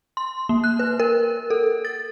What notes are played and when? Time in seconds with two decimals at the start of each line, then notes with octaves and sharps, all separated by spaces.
0.17 C6
0.49 A#3
0.64 F#6
0.79 B4
1.00 A#4
1.50 A4
1.85 A6